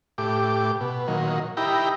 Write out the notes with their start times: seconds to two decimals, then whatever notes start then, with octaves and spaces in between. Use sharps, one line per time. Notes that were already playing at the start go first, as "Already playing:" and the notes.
0.18 A2 G4 D6
0.81 B2
1.08 A#2 D#3 F#3
1.57 D#4 E4 G4 G5 A#5 B5